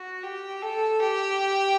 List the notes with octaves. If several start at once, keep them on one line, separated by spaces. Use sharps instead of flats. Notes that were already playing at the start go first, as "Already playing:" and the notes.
Already playing: F#4
G4
A4
G4